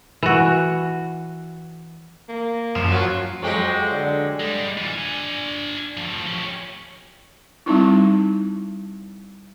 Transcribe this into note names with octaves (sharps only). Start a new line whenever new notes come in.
E3 F#4
A#3
F#2 A#2 F3
F#3 F4
F2 F#3 G#3 G4
D3
G3 G#3
E3 F4
D4 G#5
A2 F3
C#4 G4
G3 C4 D#4 E4